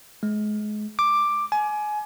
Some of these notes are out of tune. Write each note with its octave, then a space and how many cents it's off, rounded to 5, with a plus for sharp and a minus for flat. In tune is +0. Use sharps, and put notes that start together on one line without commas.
G#3 +30
D6 +5
G#5 +25